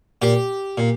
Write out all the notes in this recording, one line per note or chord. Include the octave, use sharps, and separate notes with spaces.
A#2 G4
A#2